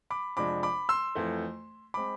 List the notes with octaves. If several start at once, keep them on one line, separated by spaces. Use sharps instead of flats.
B5 D6
F2 C3 F3 G#3 D4 B5 D6
B5 D6
C6 E6
F2 E3 A3
G#3 C4 B5 D6